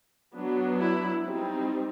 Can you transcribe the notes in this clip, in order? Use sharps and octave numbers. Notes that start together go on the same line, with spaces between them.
F#3 B3 D4
E4
G3 C4 D#4